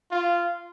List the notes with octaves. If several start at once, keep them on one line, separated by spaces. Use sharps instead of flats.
F4